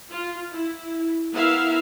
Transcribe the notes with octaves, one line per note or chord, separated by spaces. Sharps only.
F4
E4
B3 E4 A#4 E5 F5